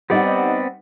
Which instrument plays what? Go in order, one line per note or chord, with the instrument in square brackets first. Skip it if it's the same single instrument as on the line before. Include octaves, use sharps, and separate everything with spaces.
[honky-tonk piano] G3 D#4 F#5 [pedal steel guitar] B3 C4 D5